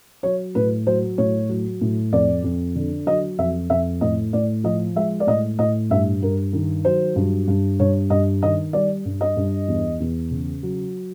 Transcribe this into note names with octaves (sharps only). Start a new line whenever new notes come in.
F#3 C#5
A2 B4
F#3 C5
A2 C#5
F#3
A2
F2 D5
F2
D3
F#3 D#5
F2 E5
F2 E5
A2 D#5
A2 D5
F3 D#5
G#3 E5
D5
A2 D#5
A2 D#5
G2 E5
G2 A#4
D#3
F#3 C5
G2
G2
G2 C#5
G2 D#5
D#3 D#5
G3 D5
G2
D#5
G2
E2
E2
C#3
F#3